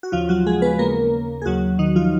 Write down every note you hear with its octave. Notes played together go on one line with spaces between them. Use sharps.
F#4
D#2 C#3 F3 F4
F#3 F#4
G#3 G#4
B3 B4
D#2 C#3 A#3 A#4
G#4
D#2 C#3 F#3 F#4
D#3 D#4
F3 F4